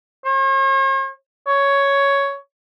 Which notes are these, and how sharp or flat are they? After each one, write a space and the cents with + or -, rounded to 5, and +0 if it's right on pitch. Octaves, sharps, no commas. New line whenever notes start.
C#5 -45
C#5 +10